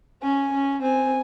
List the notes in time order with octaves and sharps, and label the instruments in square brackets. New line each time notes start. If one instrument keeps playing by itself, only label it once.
[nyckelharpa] C#4 [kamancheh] G#5
[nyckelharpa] C#4
[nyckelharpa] C4 [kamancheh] G#5